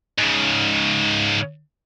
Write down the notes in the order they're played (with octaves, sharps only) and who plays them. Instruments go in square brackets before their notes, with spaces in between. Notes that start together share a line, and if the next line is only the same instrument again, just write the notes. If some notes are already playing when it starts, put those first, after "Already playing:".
[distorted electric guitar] G#2 C#3